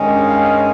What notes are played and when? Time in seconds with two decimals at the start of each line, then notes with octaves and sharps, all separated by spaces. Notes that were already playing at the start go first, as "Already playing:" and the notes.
Already playing: G2 D#3 G#3 C#4
0.27 F5